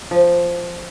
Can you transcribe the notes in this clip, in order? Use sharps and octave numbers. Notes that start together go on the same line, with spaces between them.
F3